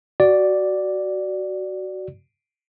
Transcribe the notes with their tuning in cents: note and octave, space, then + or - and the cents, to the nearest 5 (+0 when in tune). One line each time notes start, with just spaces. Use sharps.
F#4 +15 D5 +0